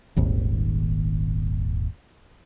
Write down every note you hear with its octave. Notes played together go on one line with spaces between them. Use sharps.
D#1 G#1 D#2